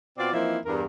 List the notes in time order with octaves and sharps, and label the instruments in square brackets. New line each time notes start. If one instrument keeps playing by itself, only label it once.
[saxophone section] B2 C4 F4 D5
E3 F3 A#3 C4 D#4 E4
E2 G2 A#4